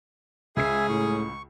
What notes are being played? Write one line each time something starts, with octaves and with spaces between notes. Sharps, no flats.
C#2 C#4 G#4 E5 G#5 C7
A2 C#6